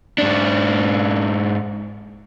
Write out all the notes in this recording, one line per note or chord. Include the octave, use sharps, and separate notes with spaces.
G#2 D4